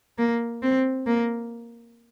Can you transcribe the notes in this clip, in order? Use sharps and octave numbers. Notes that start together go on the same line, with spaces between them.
A#3
C4
A#3